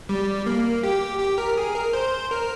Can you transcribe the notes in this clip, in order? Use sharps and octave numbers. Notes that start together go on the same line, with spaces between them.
G3
A#3
G4
G4
A#4
G#4
A#4
C5
A#4